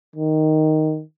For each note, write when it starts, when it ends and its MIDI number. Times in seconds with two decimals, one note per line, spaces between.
0.16 1.02 51